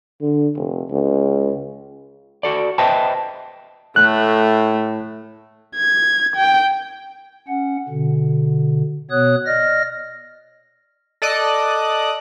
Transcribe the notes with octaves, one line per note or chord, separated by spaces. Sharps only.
D3
F1
C#2
F#4 A4 D5
B4 C5 D#5 E5 G5 A5
A2 A3 F#6
G#6
G5
C#4 F#5
B2 D3
B2 B3 C#5 D#6 F#6
D5 D#5 F6 A#6
A4 D5 D#5 F#6